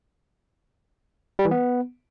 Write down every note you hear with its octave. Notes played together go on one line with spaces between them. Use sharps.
G3
E3
B3